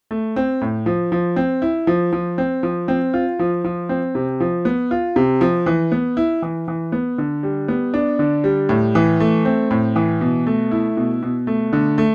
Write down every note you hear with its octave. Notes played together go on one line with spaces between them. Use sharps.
A3
C4
A2
F3
F3
C4
E4
F3
F3
C4
F3
C4
F4
F3
F3
C4
C3
F3
B3
F4
C3
F3
E3
B3
E4
E3
E3
B3
D3
G3
B3
D4
D3
G3
A2
E3
A3
C4
A2
E3
B2
A3
E4
B2
B2
A3
D3
A3